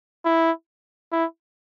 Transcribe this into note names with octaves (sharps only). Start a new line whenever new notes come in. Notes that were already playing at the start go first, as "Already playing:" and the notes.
E4
E4